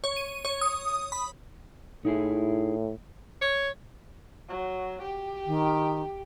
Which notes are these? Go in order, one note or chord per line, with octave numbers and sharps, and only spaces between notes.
C#5
D#7
C#5
D#6
B5
A2 D#4 E4 G#4
C#5
F#3
G4
D#3